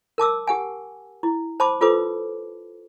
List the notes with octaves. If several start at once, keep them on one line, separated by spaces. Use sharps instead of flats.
A#4 A5 D6 E6
G4 F#5 G#5
E4
C5 A5 B5 C6 D6
F4 A4 B4 C5 D6